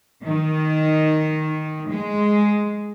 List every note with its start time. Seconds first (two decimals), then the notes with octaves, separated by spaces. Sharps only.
0.23 D#3
1.88 G#3